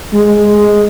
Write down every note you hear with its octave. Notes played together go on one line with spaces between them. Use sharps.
G#3